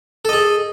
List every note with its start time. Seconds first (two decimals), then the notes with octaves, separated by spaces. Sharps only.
0.25 A4
0.29 D#5
0.33 G#4